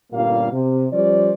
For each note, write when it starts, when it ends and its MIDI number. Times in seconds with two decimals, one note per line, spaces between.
0.13 0.48 31
0.13 0.48 46
0.13 0.48 55
0.13 0.48 58
0.13 0.48 61
0.13 0.48 77
0.52 0.86 48
0.92 1.32 53
0.92 1.32 55
0.92 1.32 61
0.92 1.32 72
0.92 1.32 74